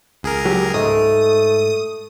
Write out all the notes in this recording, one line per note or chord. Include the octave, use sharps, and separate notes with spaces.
C#2 G#4 A#4
F#3 G4
G#2 A3 D#6